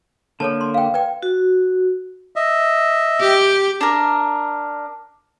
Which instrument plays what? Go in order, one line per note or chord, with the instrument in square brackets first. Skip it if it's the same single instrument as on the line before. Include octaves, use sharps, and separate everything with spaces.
[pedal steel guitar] D3 A#3 [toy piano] A4 C#5 A5
[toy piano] C6
F5 G5
B4 D5 G5
[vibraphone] F#4
[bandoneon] D#5 E5
[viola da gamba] G4
[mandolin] D4 A#4